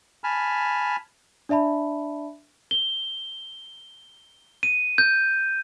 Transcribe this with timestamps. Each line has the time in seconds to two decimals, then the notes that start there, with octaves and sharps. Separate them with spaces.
0.24 G#5 A5 B5 F6
1.49 D4 D5 E5 A5 B5
2.71 G7
4.63 D#7
4.98 G6